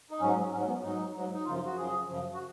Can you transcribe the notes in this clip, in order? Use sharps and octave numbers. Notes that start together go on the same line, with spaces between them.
D#4
G#2 F#3 C#4
G#2 F#3 C#4
B3
G#2 F#3 D#4
G#2 F#3
D#4
F#2 C#3 F3 F4
F#4
F#2 C#3 F3 G#4
F#2 C#3 F3
F#4